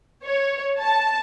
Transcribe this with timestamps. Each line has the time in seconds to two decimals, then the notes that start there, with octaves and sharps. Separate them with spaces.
0.24 C#5
0.79 A5